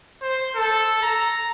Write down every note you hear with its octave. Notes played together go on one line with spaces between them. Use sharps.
C5
A4
A#5